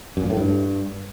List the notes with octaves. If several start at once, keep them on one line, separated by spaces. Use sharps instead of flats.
F#2
A#2
A2
G2